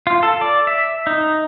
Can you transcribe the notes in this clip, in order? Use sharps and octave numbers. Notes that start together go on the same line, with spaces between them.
F4
A4
D5
E5
D#4